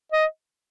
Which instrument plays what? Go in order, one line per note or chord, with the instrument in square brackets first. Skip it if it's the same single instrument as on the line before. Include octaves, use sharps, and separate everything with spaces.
[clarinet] D#5